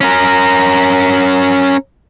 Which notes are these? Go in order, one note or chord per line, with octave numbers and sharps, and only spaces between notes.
C#4 A#4